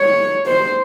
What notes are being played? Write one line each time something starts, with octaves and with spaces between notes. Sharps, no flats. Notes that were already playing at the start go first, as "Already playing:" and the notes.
Already playing: C#5
C5